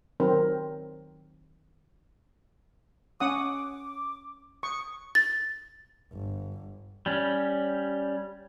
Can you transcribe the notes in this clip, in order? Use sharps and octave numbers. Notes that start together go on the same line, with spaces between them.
D#3 F#3 C4 A#4
C#4 F#5 D6 D#6
C#6 D#6
A6
G1
G3 C#4